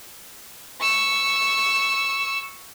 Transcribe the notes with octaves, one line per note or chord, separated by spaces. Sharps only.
C#6 E6